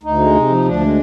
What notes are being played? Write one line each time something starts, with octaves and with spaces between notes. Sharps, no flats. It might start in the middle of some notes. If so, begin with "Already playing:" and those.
D2 D#4
G#3
C3
F3
D2 D4
G#3